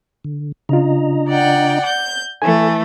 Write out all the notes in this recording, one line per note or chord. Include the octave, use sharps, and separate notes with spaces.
D3
C#3 D4 F4 D#5 A#5
D5 F#5 G5
G6
E3 A3 A4 G#5